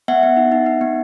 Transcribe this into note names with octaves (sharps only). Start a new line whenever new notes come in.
B3 E5 F#5
B3
D#4
D#4
D#4
B3